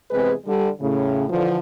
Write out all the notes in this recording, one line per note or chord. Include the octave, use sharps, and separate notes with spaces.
E2 C3 G#3 C4 G#4 B4
D3 G3
A2 C#3
D3 E3 F3